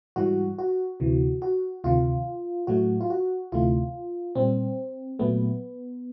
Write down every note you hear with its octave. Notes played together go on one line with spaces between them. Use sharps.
G#2 E3 G3 F#4
F#4
D2 C3 E3
F#4
D2 C3 D#3 F4
A2 F#3 A3 F#4
F4
F#4
D2 C3 E3 A3 F4
A#2 G3 C4
A#2 F#3 A3 B3